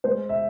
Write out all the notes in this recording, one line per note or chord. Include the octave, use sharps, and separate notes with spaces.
G#3 C5
E5